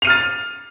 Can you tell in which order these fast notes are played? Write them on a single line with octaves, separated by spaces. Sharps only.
F7 D#7 F6 A6